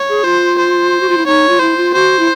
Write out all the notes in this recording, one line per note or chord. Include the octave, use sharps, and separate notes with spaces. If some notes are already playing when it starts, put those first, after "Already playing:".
Already playing: C#5
G#4
F4 C5
C5
F#4
F4
E4
D#4 C#5
F4
E4 C5
F4
F#4 C5
E4